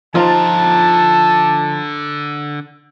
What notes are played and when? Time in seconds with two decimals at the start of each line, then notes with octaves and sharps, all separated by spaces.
0.15 D3 F3 D#4 F4 A5 A#5